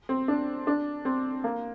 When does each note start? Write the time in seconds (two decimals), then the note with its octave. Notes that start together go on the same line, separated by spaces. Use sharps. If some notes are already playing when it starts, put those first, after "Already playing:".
0.09 C4
0.28 D4
0.67 D4
1.05 C4
1.44 A#3